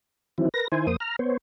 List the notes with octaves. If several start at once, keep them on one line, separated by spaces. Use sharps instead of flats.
D#3 E3 F#3 C4 E4
A#4 B4 A#6
D#3 E4 C5 G#5
F2 A#3 C5 D#6
A#5 F6
B3 C5 C#5